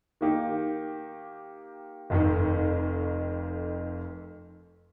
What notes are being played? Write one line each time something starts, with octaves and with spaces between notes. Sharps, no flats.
D#3 A#3 D#4 G4
F1 F2 D#3